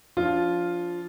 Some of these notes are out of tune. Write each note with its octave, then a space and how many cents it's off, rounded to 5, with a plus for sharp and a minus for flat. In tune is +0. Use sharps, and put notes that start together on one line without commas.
F3 +0 D4 -30 F4 +0